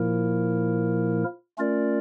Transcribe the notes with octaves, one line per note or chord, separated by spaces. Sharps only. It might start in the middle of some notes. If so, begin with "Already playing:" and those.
Already playing: A#2 F3 A#3 E4 A#4
A3 C#4 F4 A#4 D5